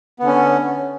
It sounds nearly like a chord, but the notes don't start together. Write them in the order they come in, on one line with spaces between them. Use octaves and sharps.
B3 D3 C#4